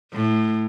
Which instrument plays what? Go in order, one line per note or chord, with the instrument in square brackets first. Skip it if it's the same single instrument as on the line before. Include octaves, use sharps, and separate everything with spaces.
[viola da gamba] A2